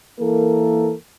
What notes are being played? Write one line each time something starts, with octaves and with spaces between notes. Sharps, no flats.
E3 A#3 E4 A4 A#4